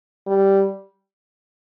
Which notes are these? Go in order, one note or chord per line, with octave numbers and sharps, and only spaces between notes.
G3